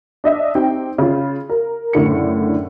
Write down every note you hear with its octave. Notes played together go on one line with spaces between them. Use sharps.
D4 D#5 E5
C4 D#4 G4 G5
C#3 F4
A#4
F#1 A2 D3 C#7